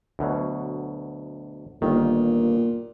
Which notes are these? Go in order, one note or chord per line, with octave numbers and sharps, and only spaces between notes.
D2 B2 F#3
G1 A#2 D#3